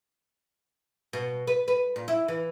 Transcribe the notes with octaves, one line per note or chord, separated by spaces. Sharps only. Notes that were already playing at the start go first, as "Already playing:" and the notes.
B2
B4
B4
A#2
E4
E3